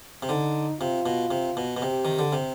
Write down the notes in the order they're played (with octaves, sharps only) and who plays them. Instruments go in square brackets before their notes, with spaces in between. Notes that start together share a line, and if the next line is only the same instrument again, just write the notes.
[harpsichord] C3
[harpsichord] D3 [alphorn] D#4
[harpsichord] C3 [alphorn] F4
[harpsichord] B2
C3
B2
B2
[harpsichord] C3 [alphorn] G4
[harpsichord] D#3
D3
C3